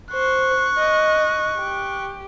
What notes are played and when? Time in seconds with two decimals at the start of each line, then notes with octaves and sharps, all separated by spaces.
0.12 C5 C#6 F#6
0.78 D#5
1.59 G4